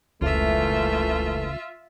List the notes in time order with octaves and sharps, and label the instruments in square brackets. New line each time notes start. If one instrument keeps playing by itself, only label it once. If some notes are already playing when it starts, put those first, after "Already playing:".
[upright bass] F1 [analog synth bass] C#2 [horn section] A#2 E3 A3 [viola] F4 E5